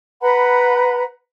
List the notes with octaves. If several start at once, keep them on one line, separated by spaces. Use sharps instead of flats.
B4 F#5 A#5 B5